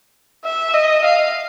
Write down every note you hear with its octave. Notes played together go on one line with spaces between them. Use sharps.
E5
D#5
F5